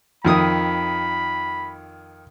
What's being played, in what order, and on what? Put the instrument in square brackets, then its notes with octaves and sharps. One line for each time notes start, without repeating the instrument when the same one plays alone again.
[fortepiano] F2 D#3 D#6 [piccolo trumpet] B5